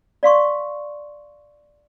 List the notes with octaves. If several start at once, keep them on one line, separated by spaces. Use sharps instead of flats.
D5 F5 C6 C#6